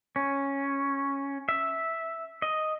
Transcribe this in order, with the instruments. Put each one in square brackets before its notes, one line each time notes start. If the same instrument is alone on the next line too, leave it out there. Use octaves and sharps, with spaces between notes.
[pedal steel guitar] C#4
E5
D#5